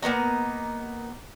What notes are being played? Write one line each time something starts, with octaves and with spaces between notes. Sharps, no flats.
A#3 B3 D#4 A#5